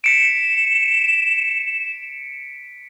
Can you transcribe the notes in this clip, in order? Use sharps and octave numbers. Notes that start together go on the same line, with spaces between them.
B6 C#7 D7 E7